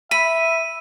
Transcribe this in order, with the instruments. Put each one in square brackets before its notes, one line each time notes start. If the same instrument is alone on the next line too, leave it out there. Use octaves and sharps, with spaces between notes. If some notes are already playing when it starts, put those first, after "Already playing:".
[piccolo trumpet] E5 [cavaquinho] B5 [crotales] D#7